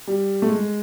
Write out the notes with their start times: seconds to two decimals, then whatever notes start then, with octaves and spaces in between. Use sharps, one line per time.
0.07 G3
0.42 A3
0.49 G#3